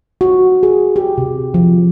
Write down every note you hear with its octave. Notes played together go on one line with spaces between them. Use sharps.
F#4
G#4
G4
C3
F3